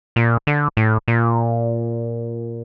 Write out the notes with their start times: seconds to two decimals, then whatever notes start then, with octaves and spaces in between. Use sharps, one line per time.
0.16 A#2
0.47 D3
0.77 A2
1.08 A#2